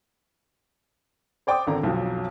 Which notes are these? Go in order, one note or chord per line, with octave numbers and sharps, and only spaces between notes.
C5 D5 G5 C6 D6 D#6
G#1 D3 C4 A#5
B1 F2 F3 F#3